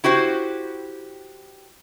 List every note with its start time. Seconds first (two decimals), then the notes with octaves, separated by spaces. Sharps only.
0.04 E4 F#4 G4 C5